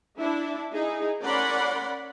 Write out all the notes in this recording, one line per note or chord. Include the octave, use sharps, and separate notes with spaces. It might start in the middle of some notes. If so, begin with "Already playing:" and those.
D4 E4 E5
D#4 E4 G#4
C#4 A#4 D5 F#5 B5 C6